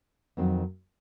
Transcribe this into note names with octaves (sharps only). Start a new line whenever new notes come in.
F2 D#3 F#3 C4